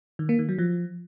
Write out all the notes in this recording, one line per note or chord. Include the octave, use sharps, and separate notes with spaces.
D#3
A#3
D#3
F#3
F3